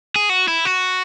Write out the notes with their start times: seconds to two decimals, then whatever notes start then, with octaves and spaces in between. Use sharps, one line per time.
0.16 G#4
0.29 F#4
0.48 E4
0.65 F#4